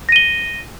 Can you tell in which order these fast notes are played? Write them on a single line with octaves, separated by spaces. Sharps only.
A#6 D#7 G7